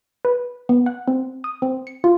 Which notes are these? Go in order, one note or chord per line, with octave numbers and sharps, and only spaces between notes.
B4
B3
F#5
C4
D#6
C4
C#7
F4